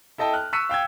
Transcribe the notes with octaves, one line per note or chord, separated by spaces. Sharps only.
E4 A4 D#5 G5 A5
F6 F#6
C#6 E6 F#6 B6 C#7 D#7
F5 G5 E6 G#6